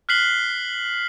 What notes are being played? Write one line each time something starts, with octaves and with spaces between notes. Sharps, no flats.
F6 F#6 B6 C7 F#7 G7